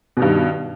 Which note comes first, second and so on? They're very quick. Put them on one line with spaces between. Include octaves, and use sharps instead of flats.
B2 D#3 G2